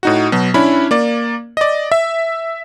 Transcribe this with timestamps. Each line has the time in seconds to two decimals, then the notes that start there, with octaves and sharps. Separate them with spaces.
0.03 A2 D#4 F#4
0.32 B2 F#3
0.54 C#4 D4 E4 B5
0.91 A#3 D5
1.57 D5 D#5
1.92 E5